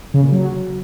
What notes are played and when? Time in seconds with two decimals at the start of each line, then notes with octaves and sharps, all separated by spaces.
0.14 C#3
0.23 A#2
0.31 F#3